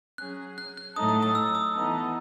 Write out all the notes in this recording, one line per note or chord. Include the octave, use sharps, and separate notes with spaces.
F#3 C#4 G#4 F#6
F#6
F#6
A2 F#3 A3 D#4 A4 D#6
D#6
D#6
E6
D#6
E3 B3 D#4 A4